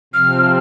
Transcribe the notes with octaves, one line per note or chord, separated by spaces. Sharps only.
C3 F3 C4 F6